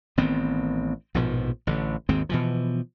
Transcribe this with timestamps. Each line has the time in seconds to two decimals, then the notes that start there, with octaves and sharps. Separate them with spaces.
0.17 A1 D#3 B3 C4
1.14 A#1 G#2 B2 F3
1.67 A1 D3
2.09 G#1 D#2 G#3 C4
2.29 B2 E3 F3